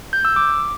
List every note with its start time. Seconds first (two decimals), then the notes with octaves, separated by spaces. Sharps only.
0.13 G6
0.25 E6
0.36 D6